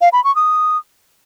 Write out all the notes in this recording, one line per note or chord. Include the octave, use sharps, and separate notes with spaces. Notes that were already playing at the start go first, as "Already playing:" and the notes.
F5
B5
C#6
D#6